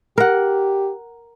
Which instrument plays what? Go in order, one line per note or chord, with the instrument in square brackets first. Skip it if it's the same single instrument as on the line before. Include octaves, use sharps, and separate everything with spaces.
[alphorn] G4 [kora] A#4 F#5